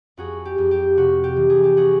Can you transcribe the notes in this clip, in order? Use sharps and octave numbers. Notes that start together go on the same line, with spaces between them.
F2 F#4 G#4
G4
F2
G4
C3 F#4
G4
E3
G#4
G4
F#4 G#4